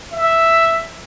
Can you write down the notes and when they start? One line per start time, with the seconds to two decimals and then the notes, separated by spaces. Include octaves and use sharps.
0.12 E5